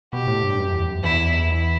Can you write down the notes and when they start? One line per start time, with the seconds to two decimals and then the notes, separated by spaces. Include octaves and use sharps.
0.13 B2 G4
0.27 A2
0.43 G2
0.58 F#2
0.73 E2
0.88 F#2
1.03 E2 E4
1.48 E4